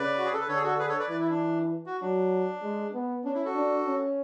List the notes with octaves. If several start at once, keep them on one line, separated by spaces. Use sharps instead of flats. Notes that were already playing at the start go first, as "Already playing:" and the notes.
Already playing: C#3 B4 D5
F#4
G#4
A4
B4
D3 A4 C#5
G#4
F#4 A4
G#4 B4
A4 C#5
B4 D5
E3 B4 D5
E4
D4
F#4
F#3 D4
G#3
B3
C#4 D4
E4
F#4 A4
D4
C#4